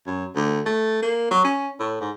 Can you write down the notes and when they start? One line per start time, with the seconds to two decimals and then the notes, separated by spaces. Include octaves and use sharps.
0.07 F#2
0.35 D2
0.66 A3
1.02 A#3
1.31 F#3
1.44 C#4
1.79 A2
2.01 G#2